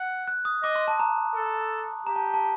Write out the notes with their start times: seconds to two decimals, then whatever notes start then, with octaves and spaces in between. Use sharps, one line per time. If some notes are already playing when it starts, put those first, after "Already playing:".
Already playing: F#5
0.28 F#6
0.45 D#6
0.63 D#5 D6
0.76 C6
0.88 A5
1.00 A#5
1.35 A4
2.06 G4 A#5
2.16 A5
2.34 A5